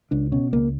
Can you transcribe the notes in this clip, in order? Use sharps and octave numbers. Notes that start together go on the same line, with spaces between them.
C#2 D4
B2 C#4
C#2 A#3